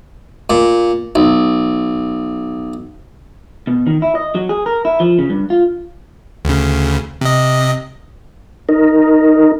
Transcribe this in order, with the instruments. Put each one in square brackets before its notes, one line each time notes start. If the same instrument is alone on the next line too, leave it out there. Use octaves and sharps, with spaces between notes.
[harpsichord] A#2
B1
[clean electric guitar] B2
D#3
E4
D#5
F#3
G#4
A#4
E4
F3
C#3
G2
F4
[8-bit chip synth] D2 C#3
C3 D#5
[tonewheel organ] D#4 A#4